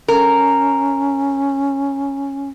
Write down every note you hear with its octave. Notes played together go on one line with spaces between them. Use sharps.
C#4 A#4